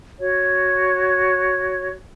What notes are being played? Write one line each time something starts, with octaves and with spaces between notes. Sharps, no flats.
F#4 C#5